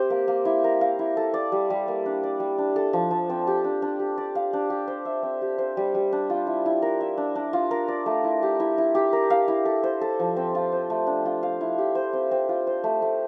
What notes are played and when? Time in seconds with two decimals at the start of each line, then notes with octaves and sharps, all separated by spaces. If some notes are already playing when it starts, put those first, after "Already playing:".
Already playing: C4 G4 C5 E5
0.10 A#3
0.28 A#3
0.45 E4
0.64 A#4
0.81 F5
0.99 E4
1.17 A4
1.34 D5
1.52 G3
1.70 G3
1.88 A#3
2.06 D4
2.23 D5
2.40 G3
2.58 D4
2.76 A4
2.93 F3
3.11 F3
3.30 C4
3.47 G4
3.64 D4
3.82 D4
3.99 G4
4.18 D5
4.35 F5
4.53 D4
4.70 G4
4.88 C5
5.05 E5
5.23 C4
5.42 G4
5.58 C5
5.77 G3
5.95 G3
6.12 D4
6.30 F4
6.47 E4
6.66 E4
6.82 A#4
7.01 E5
7.18 D4
7.35 D4
7.53 F4
7.71 A#4
7.88 D5
8.06 A3
8.24 E4
8.43 G4
8.60 E4
8.78 E4
8.95 G4
9.13 A#4
9.30 F5
9.48 E4
9.65 A4
9.83 C5
10.01 A4
10.19 F3
10.37 C4
10.55 F4
10.72 C5
10.90 A3
11.07 D4
11.25 F4
11.43 F5
11.61 E4
11.78 G4
11.95 C5
12.13 C4
12.31 C4
12.49 F4
12.67 C5
12.84 A3
13.02 A3